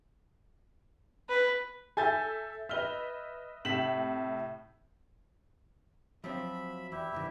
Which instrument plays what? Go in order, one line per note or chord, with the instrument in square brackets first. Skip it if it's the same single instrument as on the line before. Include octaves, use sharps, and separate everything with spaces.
[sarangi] B4
[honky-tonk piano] A4 E5 [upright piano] G#5 G6 A6
[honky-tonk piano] B4 D#5 E5 [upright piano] F6 G7
[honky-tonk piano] A2 C3 [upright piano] B6 E7 F#7
[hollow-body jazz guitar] F3 F#3 C4 [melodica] E5 B5
[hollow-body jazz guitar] E2 [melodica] E4 G4 E5
[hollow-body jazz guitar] C2 G2 E3